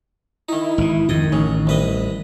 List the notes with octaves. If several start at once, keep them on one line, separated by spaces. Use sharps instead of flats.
D#3 D#4 E4
G#1 E3
F2 G#2 D#3 D#5
A1 C#3
C2 B4 D#5